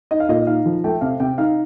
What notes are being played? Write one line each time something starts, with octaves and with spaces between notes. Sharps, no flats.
D#4 D#5
F5
A#2 D#5
D#4 F5
F3
A3 G5
C3 F5
C3 G5
D#4 F5